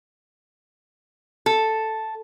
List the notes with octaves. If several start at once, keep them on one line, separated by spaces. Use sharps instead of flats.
A4